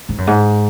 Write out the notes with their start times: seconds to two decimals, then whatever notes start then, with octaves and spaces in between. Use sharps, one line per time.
0.09 G#2
0.18 F#2
0.27 G#2